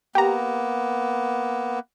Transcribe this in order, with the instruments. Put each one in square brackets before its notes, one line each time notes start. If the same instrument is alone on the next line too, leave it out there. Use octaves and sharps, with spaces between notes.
[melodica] A#3 B3 [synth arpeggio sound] G4 A#5